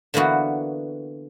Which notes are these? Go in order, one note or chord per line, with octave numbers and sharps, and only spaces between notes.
D3 E3 A#3 B3 F#4